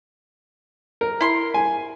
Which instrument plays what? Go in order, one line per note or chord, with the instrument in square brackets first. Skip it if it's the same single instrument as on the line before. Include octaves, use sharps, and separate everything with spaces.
[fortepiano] A#4
[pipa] E4 C6
[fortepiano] G#5